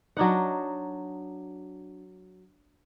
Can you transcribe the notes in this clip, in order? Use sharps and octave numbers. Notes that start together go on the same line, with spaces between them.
F#3 D4 D#4 F#5